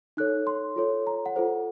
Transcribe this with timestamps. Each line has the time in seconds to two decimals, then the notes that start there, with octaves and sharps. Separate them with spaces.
0.17 D#4 A4 C#5 F#6
0.47 C6
0.76 F4 A4 C#5
1.07 A#5
1.26 F#5
1.36 F4 A4 C5